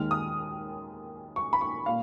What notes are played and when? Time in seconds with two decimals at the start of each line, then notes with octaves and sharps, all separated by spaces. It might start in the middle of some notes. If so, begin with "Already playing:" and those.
Already playing: D#2 D#3 G#3 F6
0.11 D#6
1.36 C#6
1.53 B5
1.61 C#6
1.86 A#2 F5